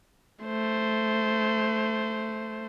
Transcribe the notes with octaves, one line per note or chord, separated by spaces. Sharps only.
A3 C5